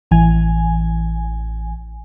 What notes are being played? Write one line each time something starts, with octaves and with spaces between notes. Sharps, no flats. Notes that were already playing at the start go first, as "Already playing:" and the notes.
A1 E3 G#5